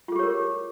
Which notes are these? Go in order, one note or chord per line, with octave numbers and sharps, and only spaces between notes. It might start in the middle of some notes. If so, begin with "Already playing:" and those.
F4 G4 G#4 A#4 C#5